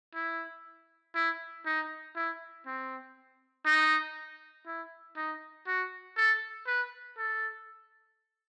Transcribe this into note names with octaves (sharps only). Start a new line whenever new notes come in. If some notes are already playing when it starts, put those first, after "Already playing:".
E4
E4
D#4
E4
C4
D#4
E4
D#4
F#4
A4
B4
A4